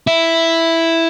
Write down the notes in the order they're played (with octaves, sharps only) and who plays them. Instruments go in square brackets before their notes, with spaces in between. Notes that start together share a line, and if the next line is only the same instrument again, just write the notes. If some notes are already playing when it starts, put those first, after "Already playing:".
[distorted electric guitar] E4